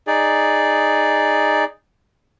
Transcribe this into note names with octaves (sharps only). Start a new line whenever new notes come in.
D#4 G#4 D5